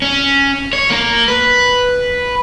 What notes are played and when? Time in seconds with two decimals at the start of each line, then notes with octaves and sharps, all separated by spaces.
0.02 C#4
0.73 C#5
0.90 A#3
1.28 B4